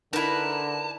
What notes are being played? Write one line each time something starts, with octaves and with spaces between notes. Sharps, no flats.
D3 D#4 E4 A#4 B4 A5